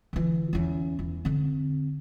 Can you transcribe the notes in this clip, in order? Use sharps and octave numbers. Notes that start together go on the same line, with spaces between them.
D3 E3
E2 C#4
E2
D3 C4